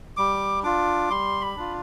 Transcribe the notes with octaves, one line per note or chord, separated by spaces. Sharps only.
G3 D6
D4 F4 D6
G3 C6
B5
D4 F4